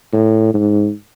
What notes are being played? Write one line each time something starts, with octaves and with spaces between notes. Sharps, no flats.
A2
G#2